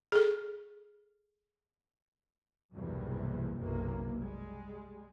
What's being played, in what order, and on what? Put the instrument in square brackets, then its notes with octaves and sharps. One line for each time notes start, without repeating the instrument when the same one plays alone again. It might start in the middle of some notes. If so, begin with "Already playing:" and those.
[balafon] G#4 A4
[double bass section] B1 E2 G2 C3 G3 A#3
F#1 B1 C3 A#3
G3 G#3